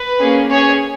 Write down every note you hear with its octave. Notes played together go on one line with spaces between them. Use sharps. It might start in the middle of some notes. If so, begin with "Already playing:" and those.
Already playing: B4
A#3 C#4 G#4
C#4 G#4 C#5